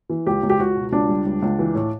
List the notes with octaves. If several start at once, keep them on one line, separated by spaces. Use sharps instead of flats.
E3
C#2 G4
C#2
G4
C#2 F#4
B2
C#2 D4
G3
C#2
C#2
E3
A2